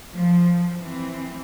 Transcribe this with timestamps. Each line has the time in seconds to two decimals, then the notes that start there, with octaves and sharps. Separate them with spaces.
0.12 F3
0.78 E3 C4